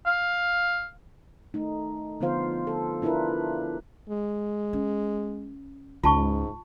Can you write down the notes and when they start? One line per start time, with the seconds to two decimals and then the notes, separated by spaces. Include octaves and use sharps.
0.06 F5
1.54 A3 D#4
2.21 D3 F3 B3 F4 C5 F5
2.67 A4
3.02 D4 E4 F4 A#4 B4
4.09 G#3
4.73 C#4
6.03 C#2 G#2 F4 A5 C#6